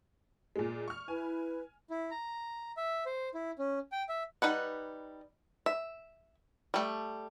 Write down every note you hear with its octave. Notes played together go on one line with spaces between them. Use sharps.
A#2 G#3
C#6 F6
E4 B4 G#5
E4
A#5
E5
C5
E4
C#4
G5
E5
G3 D#4 B4 F#5
E5
G3 A3